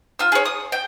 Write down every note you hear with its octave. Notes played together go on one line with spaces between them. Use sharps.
F4 E6
G#4 C#5
D#6
G5